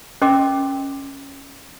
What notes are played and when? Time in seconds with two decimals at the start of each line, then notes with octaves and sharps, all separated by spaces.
0.22 C#4 A#4 D#5 G5 C6 D6